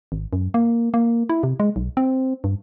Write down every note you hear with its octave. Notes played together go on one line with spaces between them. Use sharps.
G#1
F#2
A#3
A#3
E4
C3
G#3
B1
C4
G2